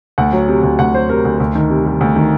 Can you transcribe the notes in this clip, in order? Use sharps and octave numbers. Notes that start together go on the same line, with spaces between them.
D2 F#5
F#3
C3
D2
D2 F#5
F#3 C5
C3 A#4
D2
D2
D#3
C3
G3
D2
D#3